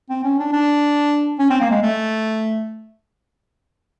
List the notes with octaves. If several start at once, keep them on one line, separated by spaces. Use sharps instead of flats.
C4
C#4
D4
D4
C#4
C4
A#3
G#3
A3